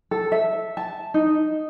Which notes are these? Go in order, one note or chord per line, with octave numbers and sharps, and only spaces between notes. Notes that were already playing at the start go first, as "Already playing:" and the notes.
A4
E5
A5
D#4